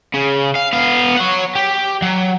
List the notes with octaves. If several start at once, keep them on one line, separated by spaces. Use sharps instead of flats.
C#3
F5
B3 F5
C#5 F#5
G4
F#3